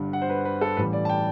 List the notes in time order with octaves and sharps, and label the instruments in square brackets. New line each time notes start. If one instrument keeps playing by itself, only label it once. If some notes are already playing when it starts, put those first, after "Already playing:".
Already playing: [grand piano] G1 G2 D3 G3
F#5
C5
B4
B4
A4
A1 A2 E3 G3 B4
D5
A5
G5